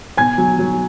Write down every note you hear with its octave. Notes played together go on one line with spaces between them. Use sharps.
B2 G#5 G#6
F#3
F#3